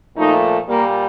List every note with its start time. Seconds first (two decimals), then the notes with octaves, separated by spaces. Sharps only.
0.16 A#2 F3 A3 D#4
0.67 A#2 G3 A#3